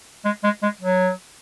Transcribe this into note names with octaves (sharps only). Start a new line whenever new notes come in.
G#3
G#3
G#3
F#3